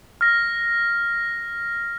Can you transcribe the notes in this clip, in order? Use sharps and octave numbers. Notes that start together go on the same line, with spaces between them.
F6 A#6